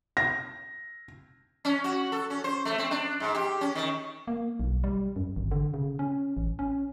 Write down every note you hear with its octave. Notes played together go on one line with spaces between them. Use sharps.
A#6
C#4
F#4
A4
C#4
C5
A3
C4
D4
G#2
G4
C#4
D#3
A#3
B1
G3
F#2
G#1
D3
C#3
C#4
A1
C#4